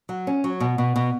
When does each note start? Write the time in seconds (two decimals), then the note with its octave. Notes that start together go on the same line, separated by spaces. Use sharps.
0.09 F#3
0.27 C#4
0.44 F#3
0.60 B2
0.78 B2
0.96 B2